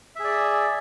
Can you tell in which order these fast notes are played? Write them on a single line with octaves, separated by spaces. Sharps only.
E5 G#4 D5